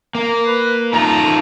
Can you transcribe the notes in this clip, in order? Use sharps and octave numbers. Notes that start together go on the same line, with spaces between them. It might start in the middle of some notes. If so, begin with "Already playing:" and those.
A#3
B4
D#4 F4 A4 A#5